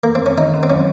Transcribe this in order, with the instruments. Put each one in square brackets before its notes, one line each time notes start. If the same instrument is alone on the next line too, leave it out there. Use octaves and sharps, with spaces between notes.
[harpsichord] A#3
C4
C#4
[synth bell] D#3 [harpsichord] D#4
[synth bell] C#4
[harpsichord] C4
[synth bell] F#3 [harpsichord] C#4